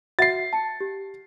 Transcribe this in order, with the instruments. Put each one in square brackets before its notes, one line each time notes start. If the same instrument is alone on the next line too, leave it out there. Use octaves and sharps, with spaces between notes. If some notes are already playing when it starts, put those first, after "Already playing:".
[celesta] F#4 E5 F#5 [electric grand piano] A6 C7
[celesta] A5 C#7
G4